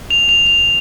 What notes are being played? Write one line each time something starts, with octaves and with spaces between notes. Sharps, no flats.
F7
F7
F7